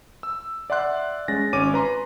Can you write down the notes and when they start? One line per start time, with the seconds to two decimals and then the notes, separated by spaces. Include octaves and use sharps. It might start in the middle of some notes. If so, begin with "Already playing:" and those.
0.23 E6
0.70 D5 E5 F#5 C6 F#6
1.28 G#3 C#4 A6 A#6
1.53 G#1 C#4 C#5 D6 D#7
1.74 B4 A#5 C6